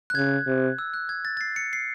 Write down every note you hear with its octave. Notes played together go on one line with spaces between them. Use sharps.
F#6
C#3 G#6
C3
E6
F#6
G#6
A6
A6
C7
C#7
C7